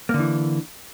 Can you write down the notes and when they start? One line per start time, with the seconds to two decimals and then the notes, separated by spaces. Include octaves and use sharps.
0.09 A#3
0.14 D3
0.19 E3